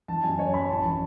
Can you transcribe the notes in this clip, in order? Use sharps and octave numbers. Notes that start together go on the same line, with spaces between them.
E3 A5
F#2 G#5
F#2 C#5
F#2 B5
A1 A5
E3